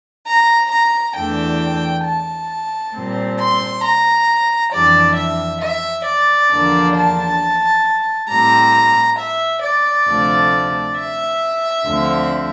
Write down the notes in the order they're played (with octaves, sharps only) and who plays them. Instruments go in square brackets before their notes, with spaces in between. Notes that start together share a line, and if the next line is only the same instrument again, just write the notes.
[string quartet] A#5
A#5
E2 E3 A3 D4 G5
A5
A#2 G3 C4
C6
A#5
F2 E3 G3 D4 D5
E5
E5
D5
E2 D3 F3 A#3 D4
A5
A2 G3 C4 A#5
E5
D5
D2 C3 F3 A3
E5
D2 D3 F3 C4